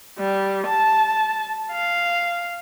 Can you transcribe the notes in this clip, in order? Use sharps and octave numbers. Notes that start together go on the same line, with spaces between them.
G3
A5
F5